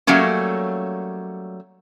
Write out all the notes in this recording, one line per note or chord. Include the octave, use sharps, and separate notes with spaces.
F#3 G3 A3 A#3 C#4